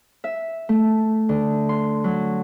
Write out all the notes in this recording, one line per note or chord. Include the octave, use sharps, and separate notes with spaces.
E5
A3
D3
C6
F#3